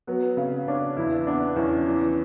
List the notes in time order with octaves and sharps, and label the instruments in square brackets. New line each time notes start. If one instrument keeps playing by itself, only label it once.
[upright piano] F#3 [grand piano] B3
[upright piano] C#3
[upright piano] C#4 [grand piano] D4
[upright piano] E2 [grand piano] E4
[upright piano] B3 [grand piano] D4
[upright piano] E2 [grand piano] C#4
[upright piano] E3